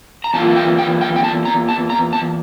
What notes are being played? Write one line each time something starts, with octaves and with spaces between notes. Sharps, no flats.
A#5
E2 E3 A#3 F4 A5
G5
G5
G5
G5
A5
A#5
A5
A#5
A5